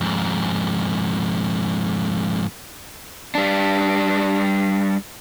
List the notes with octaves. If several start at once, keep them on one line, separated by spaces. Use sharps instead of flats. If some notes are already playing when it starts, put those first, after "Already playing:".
F2 G#2
G3 D4